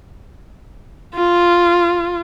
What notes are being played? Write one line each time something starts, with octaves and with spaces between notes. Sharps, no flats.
F4